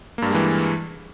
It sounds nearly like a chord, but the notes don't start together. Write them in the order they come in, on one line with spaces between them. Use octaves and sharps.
A#3 G2 G3 G#3 E3